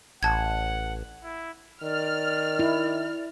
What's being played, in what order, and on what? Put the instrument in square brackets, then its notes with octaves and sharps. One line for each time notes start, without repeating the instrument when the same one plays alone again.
[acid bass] A1 [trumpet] F#5 [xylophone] A5 G#6
[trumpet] E4
[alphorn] D#3 [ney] D5 [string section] F6
[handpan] E4